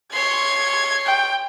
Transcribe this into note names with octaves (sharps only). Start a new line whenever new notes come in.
C#5 C6 G#6
G5